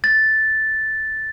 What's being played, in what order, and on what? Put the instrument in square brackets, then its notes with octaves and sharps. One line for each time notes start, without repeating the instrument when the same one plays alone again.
[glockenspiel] A6